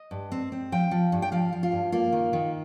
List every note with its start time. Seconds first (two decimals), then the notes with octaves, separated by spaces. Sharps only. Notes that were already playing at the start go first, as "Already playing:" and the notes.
Already playing: D#5
0.11 G2
0.32 C4
0.52 C4
0.72 F3 G5
0.91 F3
1.12 G2
1.22 G5
1.32 F3 F5
1.53 F3
1.63 F4
1.72 G2
1.92 A#3 F4
2.12 D#3
2.33 D#3